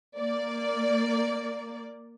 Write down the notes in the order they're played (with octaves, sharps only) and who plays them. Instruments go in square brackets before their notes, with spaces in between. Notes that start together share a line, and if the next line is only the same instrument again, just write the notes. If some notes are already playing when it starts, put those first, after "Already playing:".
[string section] A#3 D5